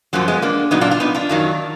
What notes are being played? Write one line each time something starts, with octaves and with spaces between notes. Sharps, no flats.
F#2 F3 F#3 A#3
G#3 B3
A#3 D4
A#2 F#3 B3 D#4
D4 F4
D4 F4
B3 D#4
D4 F4
F#2 D#3 F#3